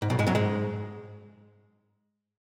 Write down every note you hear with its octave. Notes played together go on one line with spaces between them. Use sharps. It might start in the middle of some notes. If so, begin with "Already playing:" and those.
G#2
B1 B2
G#2 G#3
F#2 F#3
G#2 G#3